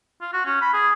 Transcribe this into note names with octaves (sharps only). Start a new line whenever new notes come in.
F4
F#4
C#4
B5
G#4